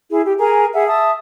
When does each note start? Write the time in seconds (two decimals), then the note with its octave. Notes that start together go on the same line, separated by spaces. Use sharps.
0.10 E4 G#4
0.25 G4
0.39 G#4 A#4 G#5 A#5
0.74 G#4 E5 F#5
0.87 E5 A5 D#6